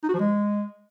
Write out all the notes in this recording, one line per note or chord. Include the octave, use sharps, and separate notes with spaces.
D#4
F#4
F3
G#3